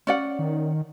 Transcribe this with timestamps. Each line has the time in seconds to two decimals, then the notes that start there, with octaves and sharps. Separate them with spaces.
0.07 C#4 D5 F#5
0.39 D#3